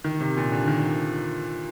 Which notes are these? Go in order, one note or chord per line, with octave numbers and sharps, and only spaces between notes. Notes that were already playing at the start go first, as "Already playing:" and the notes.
D#3
C3
A#2
D3
D#3